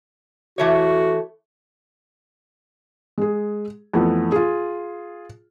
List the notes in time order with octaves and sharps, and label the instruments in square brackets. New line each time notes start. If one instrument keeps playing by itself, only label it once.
[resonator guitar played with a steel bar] E3 A3 C#5 [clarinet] F#4
[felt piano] G#3 G#4
F2 E3 A3 B3
F4 G#4